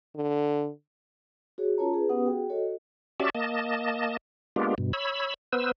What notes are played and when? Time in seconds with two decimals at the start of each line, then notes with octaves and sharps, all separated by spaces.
0.16 D3
1.58 F#4 G#4 C#5
1.78 C#4 F4 A#4 C#5 A5 A#5
1.94 G#4 B4
2.09 B3 C#4 G4 B4 F#5 D#6
2.25 F#4 G#4 G5
2.50 F#4 A4 C#5 D#5
3.20 C#4 F#4 G4 D5 E5 A5
3.35 A#3 D#5 A5
4.56 G#3 A#3 B3 D4 F4 G4
4.78 G2 B2
4.93 C#5 B5 E6
5.53 B3 B4 C5 E6